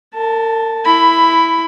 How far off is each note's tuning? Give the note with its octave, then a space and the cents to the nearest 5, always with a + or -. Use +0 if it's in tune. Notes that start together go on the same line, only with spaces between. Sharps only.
A#4 -40 A5 +0
E4 +0 B5 +15